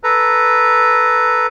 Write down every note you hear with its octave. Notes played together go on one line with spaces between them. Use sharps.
A4 B4 A#5